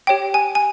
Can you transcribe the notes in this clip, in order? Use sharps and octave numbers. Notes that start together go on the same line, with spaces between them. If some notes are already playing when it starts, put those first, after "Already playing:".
G4 C#5 G5
G#5
G#5